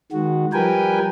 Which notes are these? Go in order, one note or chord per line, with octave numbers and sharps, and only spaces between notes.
D#3 G#3 F#4
F3 G3 A#4 B4 G5 G#5